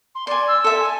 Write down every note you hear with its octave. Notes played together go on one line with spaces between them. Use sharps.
C6
D5 G#5 C6
E6
A4 E5
G#5